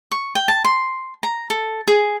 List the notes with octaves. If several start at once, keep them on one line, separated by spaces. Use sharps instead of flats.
C#6
G5
A5
C6
A#5
A4
G#4